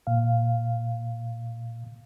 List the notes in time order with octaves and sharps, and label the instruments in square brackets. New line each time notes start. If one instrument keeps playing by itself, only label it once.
[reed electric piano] A#2 F5